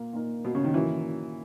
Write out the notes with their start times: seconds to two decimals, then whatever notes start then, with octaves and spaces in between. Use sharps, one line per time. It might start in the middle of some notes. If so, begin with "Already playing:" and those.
Already playing: A#2 A#3 A#4
0.13 A#2 A#3 D#4 A#4
0.45 B2
0.55 C#3
0.64 D#3
0.74 A#2 E3 F#3 C#4 F#4 A#4